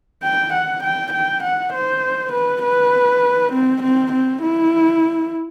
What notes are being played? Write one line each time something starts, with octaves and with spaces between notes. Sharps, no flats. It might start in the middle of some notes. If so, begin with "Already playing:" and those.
G5
F#5
G5
G5
F#5
C5
B4
B4
C4
C4
C4
E4